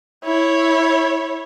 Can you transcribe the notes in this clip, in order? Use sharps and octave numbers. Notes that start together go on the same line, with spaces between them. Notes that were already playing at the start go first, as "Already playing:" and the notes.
E4 C#5